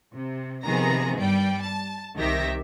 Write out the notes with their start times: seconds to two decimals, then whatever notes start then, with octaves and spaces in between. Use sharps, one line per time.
0.13 C3
0.66 C3 D#3 F3 B3 G#4 A#5
1.19 G2 G3 D5 G5
1.63 A5
2.18 C2 C3 D#3 G4 E5 A#6